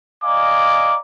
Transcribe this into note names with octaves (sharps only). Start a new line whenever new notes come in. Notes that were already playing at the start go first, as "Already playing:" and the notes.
D5 D#5 F5 G#5 A#5 D6